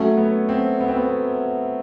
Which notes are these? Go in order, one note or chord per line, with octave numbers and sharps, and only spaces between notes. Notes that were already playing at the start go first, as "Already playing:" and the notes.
Already playing: F#3 A3 C#4
B3
C4
B3
C4
B3